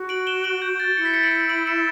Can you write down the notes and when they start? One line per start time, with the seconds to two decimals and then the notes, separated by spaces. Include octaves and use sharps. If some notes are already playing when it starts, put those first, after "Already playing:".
Already playing: F#4
0.09 D7 F#7
0.27 E7 G7
0.44 D7 F#7
0.62 G6
0.80 A6
0.97 E4 C#7
1.05 B6
1.14 A6 C#7
1.23 D7 F#7
1.49 D7 F#7
1.67 C#7 E7